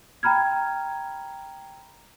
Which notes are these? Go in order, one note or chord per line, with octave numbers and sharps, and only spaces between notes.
G5 A#5 B5 F6 G#6